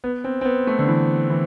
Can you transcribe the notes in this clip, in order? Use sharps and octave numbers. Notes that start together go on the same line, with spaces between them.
B3
C4
C4
B3
A3
D3
E3
E3